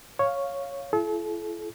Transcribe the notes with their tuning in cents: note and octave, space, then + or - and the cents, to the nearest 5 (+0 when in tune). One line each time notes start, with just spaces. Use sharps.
C#5 +0 F5 +0
E4 +45 A4 -40